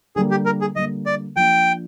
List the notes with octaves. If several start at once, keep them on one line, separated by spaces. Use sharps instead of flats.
D3 G3 A#3 G#4
G4
A#4
G#4
D3 G3 A#3 D#5
D5
F3 A#3 D4 G5